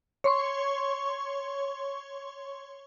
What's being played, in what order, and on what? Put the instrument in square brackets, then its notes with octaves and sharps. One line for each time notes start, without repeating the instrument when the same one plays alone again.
[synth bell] C#5 C6 C#6